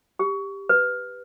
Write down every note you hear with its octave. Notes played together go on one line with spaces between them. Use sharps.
G4
B4